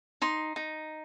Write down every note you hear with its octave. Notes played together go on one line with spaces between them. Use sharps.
D#4 C6
D#4